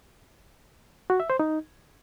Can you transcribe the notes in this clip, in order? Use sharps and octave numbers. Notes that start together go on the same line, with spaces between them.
F#4
E5
C5
D#4